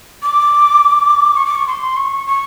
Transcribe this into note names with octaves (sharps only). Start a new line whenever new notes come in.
D6
C#6
D6
C#6
C6
C#6
C#6